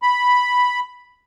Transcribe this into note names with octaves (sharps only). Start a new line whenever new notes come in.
B5